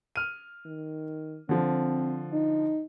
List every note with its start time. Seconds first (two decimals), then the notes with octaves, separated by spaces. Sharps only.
0.16 F6 D#7
0.66 D#3
1.49 D3 F3 C4
2.32 D#4